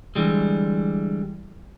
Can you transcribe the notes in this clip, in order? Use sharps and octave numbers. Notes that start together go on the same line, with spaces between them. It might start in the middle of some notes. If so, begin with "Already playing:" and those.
D3 E3 G3 G#3